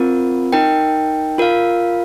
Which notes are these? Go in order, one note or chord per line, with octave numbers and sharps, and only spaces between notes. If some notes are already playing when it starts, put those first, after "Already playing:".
Already playing: C4 F4 A#4
D#4 A#4 G5
F4 A#4 F5